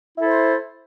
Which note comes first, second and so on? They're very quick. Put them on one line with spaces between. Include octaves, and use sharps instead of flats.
E4 A4 C5